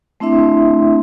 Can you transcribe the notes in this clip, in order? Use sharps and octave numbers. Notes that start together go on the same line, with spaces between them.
A3 C4 D4 E4 E5 C6